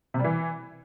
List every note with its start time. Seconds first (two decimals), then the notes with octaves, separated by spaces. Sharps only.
0.14 C3
0.19 G3
0.24 E3